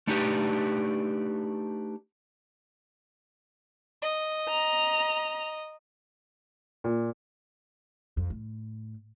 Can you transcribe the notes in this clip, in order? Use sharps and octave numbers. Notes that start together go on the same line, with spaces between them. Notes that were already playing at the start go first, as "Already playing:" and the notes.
A3 D4 D#4 G4 A4 B4
D#5
A#5
A#2
F2
A2